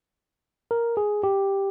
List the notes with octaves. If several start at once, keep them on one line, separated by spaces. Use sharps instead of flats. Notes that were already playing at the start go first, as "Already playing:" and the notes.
A#4
G#4
G4